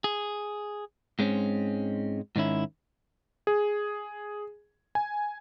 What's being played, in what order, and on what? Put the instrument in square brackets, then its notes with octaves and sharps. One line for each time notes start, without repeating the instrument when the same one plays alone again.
[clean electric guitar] G#4
G#2 G#3 C4 C#4
G#2 D#3 C#4 E4
[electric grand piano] G#4
G#5